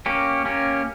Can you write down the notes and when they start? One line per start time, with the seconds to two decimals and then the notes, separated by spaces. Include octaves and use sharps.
0.06 A#3 C#4 G4
0.45 A#3 C#4 G4